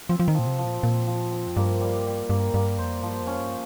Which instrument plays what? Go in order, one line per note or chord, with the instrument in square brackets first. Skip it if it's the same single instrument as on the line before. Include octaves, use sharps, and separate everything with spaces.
[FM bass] F3 [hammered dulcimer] C4
[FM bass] F3
D#3
[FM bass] A#2 [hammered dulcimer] F3
[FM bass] C3
[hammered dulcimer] F3
[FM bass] A#2
[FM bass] A#2 [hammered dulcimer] C4
[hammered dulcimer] F3
C4
[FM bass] F2
[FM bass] G2 [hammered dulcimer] A#3
[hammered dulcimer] G3
G3
[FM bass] G2 [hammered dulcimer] A#3
[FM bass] G2 [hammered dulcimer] A#3
[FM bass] F2 [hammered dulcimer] C5
[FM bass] G2 [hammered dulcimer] F3
[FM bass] F2
[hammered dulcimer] C#4
[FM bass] G2